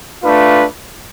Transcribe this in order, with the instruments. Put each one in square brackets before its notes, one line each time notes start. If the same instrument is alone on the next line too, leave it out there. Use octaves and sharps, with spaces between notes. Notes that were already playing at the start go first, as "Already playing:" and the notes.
[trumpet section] A3 D4 F4 B4